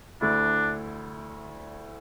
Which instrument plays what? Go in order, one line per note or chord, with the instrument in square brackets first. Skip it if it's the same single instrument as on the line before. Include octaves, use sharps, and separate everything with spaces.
[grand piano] D2 D3 A3 E4 [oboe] D4